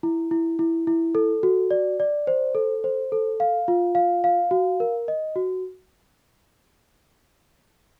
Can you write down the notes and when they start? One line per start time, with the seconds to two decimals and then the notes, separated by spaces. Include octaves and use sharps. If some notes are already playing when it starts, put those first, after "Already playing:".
0.03 E4
0.31 E4
0.59 E4
0.87 E4
1.15 A4
1.43 F#4
1.71 D5
2.00 D5
2.27 C5
2.55 A4
2.84 C5
3.12 A4
3.40 F5
3.68 F4
3.95 F5
4.24 F5
4.51 F#4
4.80 A#4
5.08 D#5
5.36 F#4